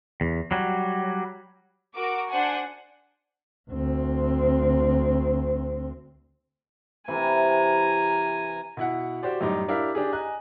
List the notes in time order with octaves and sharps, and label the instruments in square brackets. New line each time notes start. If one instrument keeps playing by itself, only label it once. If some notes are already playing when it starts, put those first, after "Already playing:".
[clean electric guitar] E2
F#3 G3
[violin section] F#4 A#4 D6
D4 C5 F#5 G#5
[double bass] D2 C4
[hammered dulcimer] C3 E3 B5 [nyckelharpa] G#5 A#5
[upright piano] B2 E4 F#5
F#4 G4 C5 D5
F#2 A2 G3 D#4 D6
D4 E4 G4 A#4 F5
D4 G4 G#4
D#5 G#5 A#5 F#6